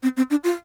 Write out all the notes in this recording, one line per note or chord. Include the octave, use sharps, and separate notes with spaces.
C4
C4
D4
F4